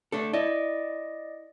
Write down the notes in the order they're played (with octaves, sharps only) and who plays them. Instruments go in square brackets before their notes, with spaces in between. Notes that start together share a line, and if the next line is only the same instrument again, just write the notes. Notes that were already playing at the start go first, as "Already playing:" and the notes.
[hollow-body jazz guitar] A3 D4 A4
[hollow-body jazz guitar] E4 [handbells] D5 D#5